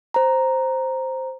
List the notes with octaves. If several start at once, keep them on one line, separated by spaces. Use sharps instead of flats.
C5 A#5